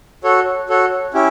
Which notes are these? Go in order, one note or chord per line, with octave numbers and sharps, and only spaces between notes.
F#4 A4 C#5
F#4 A4 C#5
C#4 E4 G4